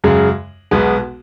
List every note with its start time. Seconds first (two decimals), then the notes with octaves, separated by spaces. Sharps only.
0.04 F#2 C#3 G#3
0.71 B1 B2 G#3 B3